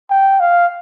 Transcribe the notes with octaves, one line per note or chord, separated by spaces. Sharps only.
G5
F5